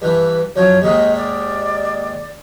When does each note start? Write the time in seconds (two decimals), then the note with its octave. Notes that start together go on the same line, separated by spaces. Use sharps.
0.02 G2 E3 B4
0.56 F#2 F3 C#5
0.82 D#2 G#2 D#3 D#5
1.16 D5